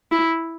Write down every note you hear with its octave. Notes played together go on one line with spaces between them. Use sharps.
E4